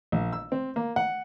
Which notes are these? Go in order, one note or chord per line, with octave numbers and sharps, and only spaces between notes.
A#1
E6
C4
A#3
F#5